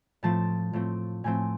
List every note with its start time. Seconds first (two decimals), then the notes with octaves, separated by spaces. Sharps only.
0.23 A2 F3 A3 C4 A5
0.73 A2 F3 A3 C4
1.24 A2 F3 A3 C4 G#5